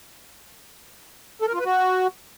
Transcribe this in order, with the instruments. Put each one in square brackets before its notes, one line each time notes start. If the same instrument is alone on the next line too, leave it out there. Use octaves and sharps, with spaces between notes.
[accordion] A4
A#4
F4
B4
F#4